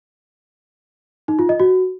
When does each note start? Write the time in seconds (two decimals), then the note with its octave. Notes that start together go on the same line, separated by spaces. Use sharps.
1.28 D#4
1.39 F4
1.49 D#5
1.60 F#4